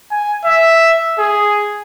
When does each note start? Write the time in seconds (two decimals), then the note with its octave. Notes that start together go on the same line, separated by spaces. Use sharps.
0.11 G#5
0.45 E5
1.19 G#4